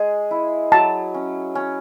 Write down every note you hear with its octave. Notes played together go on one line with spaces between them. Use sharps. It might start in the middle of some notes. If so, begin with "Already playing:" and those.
Already playing: G#3 G#4
E4
F#3 A5
C#4
C#4